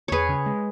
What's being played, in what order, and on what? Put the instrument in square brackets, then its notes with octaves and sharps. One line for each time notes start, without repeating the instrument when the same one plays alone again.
[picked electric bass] E2 [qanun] G#4 B4 C#5
[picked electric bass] C#3
G#3